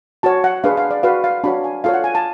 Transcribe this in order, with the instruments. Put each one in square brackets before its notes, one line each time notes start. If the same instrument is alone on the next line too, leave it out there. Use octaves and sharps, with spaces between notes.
[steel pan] F#4 C#5 A5
F#5
D4 G#4 B4 F5
F5
D5
F#4 B4 F5
F5
D4 F#4 C#5 B5
G#5
F4 A4 C#5 F5
F#5
G#5
A5